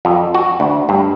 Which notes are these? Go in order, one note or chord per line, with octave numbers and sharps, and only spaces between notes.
F2
F#4
D2
G2